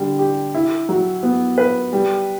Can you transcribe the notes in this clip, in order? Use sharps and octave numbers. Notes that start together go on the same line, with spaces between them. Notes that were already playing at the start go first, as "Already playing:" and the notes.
Already playing: D3 G3
G4
E4
F#3
B3
B4
G3